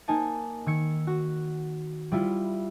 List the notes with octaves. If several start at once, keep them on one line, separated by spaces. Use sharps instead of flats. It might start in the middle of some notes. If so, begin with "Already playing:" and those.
A#3 D#4 G#5 A5
D#3 E6 G#6 C#7
F#4
G3 E4 F4